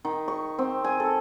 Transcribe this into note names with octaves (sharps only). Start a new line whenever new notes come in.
D#3
C#6
C4
G#5
A4